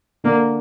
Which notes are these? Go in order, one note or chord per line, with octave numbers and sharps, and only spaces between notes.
D3 A#3 D4